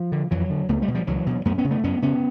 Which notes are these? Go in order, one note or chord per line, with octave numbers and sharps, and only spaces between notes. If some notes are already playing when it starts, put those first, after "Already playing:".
Already playing: F3
D3
F2 E3 F#3
D3
C#2 A3 B3
G3 A3
B2
F3 G3
C#2 E3 F#3
B2
F#2 A3 B3
B3 C#4
C#3
A3 B3
F#2 B3 C#4
C#3 B3 C#4